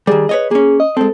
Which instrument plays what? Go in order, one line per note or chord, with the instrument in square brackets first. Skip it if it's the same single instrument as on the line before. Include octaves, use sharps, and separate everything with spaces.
[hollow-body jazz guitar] D#3 G3 [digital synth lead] G#4
[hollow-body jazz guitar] B4 C#5 D#5
[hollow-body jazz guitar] A#3 C#4 [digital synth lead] G#4
[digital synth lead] D#5
[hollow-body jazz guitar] G#3 C4 [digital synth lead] A4